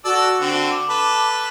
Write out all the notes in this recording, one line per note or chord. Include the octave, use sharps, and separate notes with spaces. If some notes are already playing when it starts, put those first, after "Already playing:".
F#4 A4 D5 E6
D3 C4
D6
A4 B4